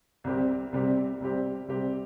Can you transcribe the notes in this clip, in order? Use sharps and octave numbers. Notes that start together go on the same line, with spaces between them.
C2 C3 G3 C4 G4
C2 C3 G3 C4 G4
C2 C3 G3 C4 G4
C2 C3 G3 C4 G4